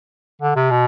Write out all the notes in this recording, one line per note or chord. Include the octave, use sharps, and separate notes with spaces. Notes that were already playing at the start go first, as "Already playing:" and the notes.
D3
C3
B2